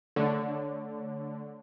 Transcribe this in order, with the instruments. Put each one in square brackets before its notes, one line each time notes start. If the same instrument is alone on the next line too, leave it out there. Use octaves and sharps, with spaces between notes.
[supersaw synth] D3 [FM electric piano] A3 C#5